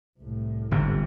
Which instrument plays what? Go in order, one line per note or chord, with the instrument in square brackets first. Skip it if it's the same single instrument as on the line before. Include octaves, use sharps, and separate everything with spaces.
[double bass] C2 A2
[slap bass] G1 G#2 C3